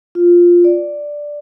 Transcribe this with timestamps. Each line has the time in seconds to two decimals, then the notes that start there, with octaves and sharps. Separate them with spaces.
0.15 F4
0.64 D5